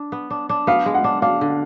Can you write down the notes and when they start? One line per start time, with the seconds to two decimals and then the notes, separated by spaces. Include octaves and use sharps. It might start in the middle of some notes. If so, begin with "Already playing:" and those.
Already playing: D4
0.12 B3
0.30 D4
0.49 D4
0.67 B3 F5
0.86 G#3
0.94 F#5
1.04 D4
1.22 D4 F5
1.41 D3